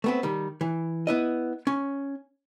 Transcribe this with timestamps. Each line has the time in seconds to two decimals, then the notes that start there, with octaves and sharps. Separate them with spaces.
0.04 A3 B3 C4
0.23 D#3 G3
0.61 E3
1.07 B3 E4 D#5
1.67 C#4